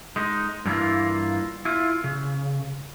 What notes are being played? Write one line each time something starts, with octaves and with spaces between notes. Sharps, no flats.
G#3 D#4
G2 E3 A#3 C4 E4 F4
E4 F4
C#3